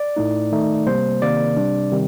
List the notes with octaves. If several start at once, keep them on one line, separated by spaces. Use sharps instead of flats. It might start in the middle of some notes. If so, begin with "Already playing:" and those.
Already playing: D5
A2 A3 D#4
D#3 A3 D#4
C3 G3 A#3 C5
C3 D#3 A#3 D5
C3 G3 D4
C3 D#3 G3